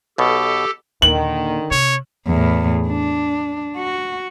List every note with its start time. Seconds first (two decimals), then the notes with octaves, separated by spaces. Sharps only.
0.18 B1 B2 G4 A4
1.02 D#2 A#2 D3 D#3 F#7
1.71 C3 C#5
2.27 E2 A2
2.87 D4
3.77 F#4